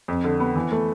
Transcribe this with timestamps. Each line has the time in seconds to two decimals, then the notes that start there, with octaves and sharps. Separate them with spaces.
0.08 F2
0.24 D3
0.40 B3
0.56 E3
0.72 A3